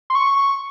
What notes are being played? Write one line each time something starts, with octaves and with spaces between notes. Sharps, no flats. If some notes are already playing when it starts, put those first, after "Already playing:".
C6
C#6